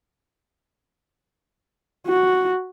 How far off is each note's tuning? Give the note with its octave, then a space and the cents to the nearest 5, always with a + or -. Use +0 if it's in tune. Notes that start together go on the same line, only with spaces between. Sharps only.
F#4 +0